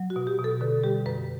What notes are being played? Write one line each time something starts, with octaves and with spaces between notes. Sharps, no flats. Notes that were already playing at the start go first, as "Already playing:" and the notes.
Already playing: F#3
F#4
B2
G4
B2
A4
D3 B4
G3 G4
F#2 B4